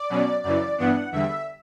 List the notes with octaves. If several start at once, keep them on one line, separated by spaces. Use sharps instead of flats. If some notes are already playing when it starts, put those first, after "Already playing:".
Already playing: D5
B2 F#3 C#4
F#2 C#3 E3 D5
G2 E3 B3 D4 F#5
E2 D3 G3 E5